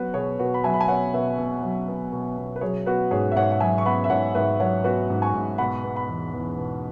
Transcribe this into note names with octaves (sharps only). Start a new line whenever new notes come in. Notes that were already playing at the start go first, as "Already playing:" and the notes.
Already playing: F#3 B3 F#4 B4
B2 G#4 C#5
B2 F#4 B4
B5
F#3 E5 G#5
B5
G#5
B3 C#5 F#5
B2 B4 E5
B2
F#3
B3
B2
B2
B4
F#3 G#4 C#5
B3 F#4 B4
G#2 G#4 C#5
E5
G#2 C#5 F#5
F#5
F#3 E5 G#5
C#6
B3 F#5 B5
E5
G#2 C#5 F#5
G#2 B4 E5
F#3 C#5 F#5
B3 F#4 B4
G#2
G#5 C#6
G#2
B2 F#5 B5
B3
F#5 B5
E2
E2
B2